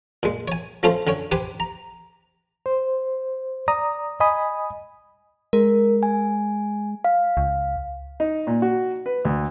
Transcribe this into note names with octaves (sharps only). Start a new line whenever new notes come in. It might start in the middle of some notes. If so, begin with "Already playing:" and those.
A#2 G#3
C#5 G#5
F3 A3 C#4 F4 A4 C5
D3 C#4 C#5
G4 B4 C5 G#5
A#5
C5
D5 A#5 D#6
D#5 G#5 B5 D#6
G#3 A#4
G#5
F5
C#2
D#4
A#2
F#4
B4
D2